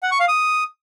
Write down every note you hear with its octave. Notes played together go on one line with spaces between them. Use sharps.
F#5
C#6
F5
D#6